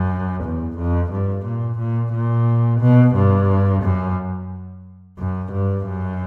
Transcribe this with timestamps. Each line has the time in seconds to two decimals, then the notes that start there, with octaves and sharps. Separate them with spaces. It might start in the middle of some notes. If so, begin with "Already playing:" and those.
Already playing: F#2
0.44 E2
0.78 F2
1.12 G2
1.45 A#2
1.78 A#2
2.12 A#2
2.80 B2
3.15 G2
3.83 F#2
5.18 F#2
5.52 G2
5.86 F#2